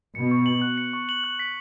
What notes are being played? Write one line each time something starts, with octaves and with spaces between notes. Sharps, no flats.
B2 C#7
C#6
F#7
F#6
C#7
C#6
F#7
F#6
B6